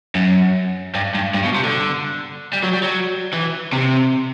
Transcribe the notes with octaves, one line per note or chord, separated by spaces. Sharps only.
F#2
G2
G2
G2
B2
C3
D3
G3
F#3
G3
F#3
E3
C3